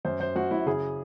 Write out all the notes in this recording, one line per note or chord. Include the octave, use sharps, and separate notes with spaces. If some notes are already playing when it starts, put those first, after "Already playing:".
F#2 C5
F#2 C5
F#2 F#4
F#2 E4
C#3 G#4